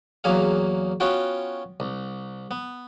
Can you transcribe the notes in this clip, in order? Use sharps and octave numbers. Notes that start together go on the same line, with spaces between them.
E2 F#3 A#3 G#4 F5
B3 C#4 F4 F#4 G5
C2
B3